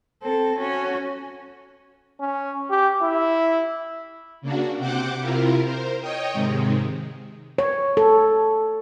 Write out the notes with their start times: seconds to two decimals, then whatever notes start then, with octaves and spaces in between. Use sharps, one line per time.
0.24 C4 A4
0.59 C#4 F#4
2.20 C#4
2.70 G4
3.02 E4
4.42 C#3 A#3 D4 F#4
4.77 C3 C4 C5 F#5 D6
5.19 C3 E4 F4 A#4
5.64 A#4 C5
6.01 C#5 D#5 G5 D#6
6.33 G#2 C3 D#3 G#3
7.58 C#5
7.97 A4